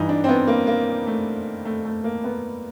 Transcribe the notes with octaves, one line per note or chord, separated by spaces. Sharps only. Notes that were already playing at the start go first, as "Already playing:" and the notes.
Already playing: G2 E3 D#4
D4
C4
B3
A#3
A#3
A3
A3
A3
A#3
B3